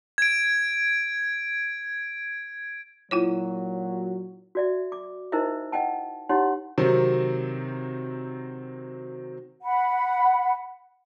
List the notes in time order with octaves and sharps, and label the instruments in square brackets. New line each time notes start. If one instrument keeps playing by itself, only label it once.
[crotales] G#6 D7
[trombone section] A#2 F#3 [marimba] E4 F4 C#5
[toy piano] F#4 D5 E5
D6
D#4 E4 A#4 C5 D#5 E5
D#5 F#5 G5 A5
D#4 E4 G4 C#5 F#5 C6
[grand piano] C3 D#3 F#3 C4
[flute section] F#5 B5